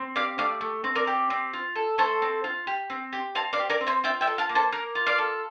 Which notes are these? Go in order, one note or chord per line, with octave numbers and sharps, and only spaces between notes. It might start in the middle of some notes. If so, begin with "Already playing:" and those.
Already playing: C4
G4 D5 F5
A3 D5 F5
A3
C4
A#4 D5
G4
C4
F4
A4
A3 A4 C5
C4
F4
G4
C4
G4
C4 F5 A5
D5 F5
G4
A#4 D5
C4
C5 E5
F4 E5 G5
E5 G5
A4
F5 A5
A#3
A4 C5
A#3 A#4
F4
D5 F5
A4